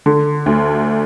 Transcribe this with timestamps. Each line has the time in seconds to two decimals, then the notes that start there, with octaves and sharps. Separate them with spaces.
0.06 D3
0.46 D2